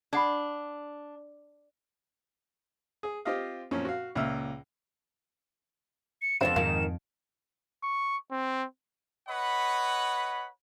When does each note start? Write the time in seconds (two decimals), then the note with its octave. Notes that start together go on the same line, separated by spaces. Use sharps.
0.13 D4 D5 F#5 B5
3.03 G#4
3.25 C4 F4 G4 C5 D#5 F5
3.71 F#2 A#2 F3 C4 C#4
3.85 F#4 F5
4.15 C#2 A#2 E5 E6 F6
6.22 C#7
6.41 F2 C3 B3 C4 D4 F4 E7
6.56 F2 G#2 D#3 F4
7.83 C#6
8.31 C4
9.28 B4 C#5 D#5 F#5 B5